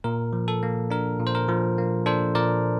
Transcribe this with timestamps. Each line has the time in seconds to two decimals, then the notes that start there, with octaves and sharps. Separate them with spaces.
0.04 A#2 A#4
0.33 F3
0.48 A4
0.63 A#3
0.90 D4 A#4
1.19 A#2
1.27 C5
1.35 A#4
1.48 F3
1.78 A#3
2.06 D4 A4 C5
2.35 A#2 A#4 D5